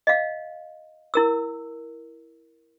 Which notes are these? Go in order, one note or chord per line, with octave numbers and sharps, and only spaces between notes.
D#5 F5
E4 A#4 E6